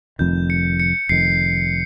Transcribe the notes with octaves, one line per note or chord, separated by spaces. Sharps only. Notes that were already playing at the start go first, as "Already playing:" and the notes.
F1 F2 D#3 G6
C#7
C#7
F1 F2 D#3 C7